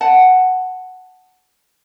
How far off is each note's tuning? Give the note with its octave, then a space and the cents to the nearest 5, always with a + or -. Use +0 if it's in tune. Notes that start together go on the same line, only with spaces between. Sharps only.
F#5 +0 A5 +0